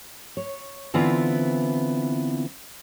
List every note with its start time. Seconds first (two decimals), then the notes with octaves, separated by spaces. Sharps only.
0.37 C#5
0.94 D3 E3 B3 C4 E4 F4